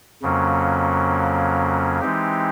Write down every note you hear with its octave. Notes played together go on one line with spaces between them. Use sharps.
F2 C#3 F#3 A#3 C#4
E3 G#3 C4 D#4 G4